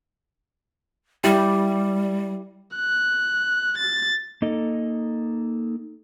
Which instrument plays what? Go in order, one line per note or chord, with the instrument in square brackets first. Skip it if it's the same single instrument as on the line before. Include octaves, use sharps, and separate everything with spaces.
[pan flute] G3 [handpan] E4 G4
[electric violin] F#6
A6
[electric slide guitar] A#3 D#4 A4 D#5